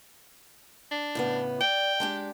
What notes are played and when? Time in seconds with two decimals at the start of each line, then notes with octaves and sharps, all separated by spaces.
0.91 D4
1.15 A2 C#3 B3
1.61 D5 G5
2.00 G#3 D4 G4